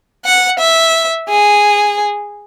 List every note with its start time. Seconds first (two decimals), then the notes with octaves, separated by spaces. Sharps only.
0.26 F#5
0.60 E5
1.29 G#4